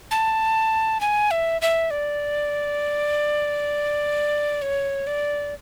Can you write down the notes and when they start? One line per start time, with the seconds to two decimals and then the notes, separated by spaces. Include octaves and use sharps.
0.11 A5
1.01 G#5
1.31 E5
1.62 E5
1.91 D5
4.62 C#5
5.07 D5